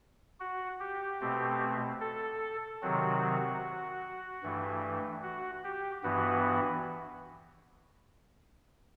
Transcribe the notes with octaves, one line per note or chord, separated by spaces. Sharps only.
F#4
G4
B2 A3 C4
A4
C3 D#3 F#3 C4 F#4
G2 E3 A3
F#4
G4
G2 E3 B3 F#4